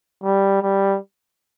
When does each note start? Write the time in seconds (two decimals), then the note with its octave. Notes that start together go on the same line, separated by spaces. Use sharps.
0.24 G3
0.63 G3